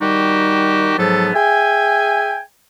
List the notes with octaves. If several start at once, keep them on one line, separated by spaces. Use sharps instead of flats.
D#3 G3 D#4 F#4 G4
G#2 F3 F#3 B3 A4
G#4 E5 G5 G#5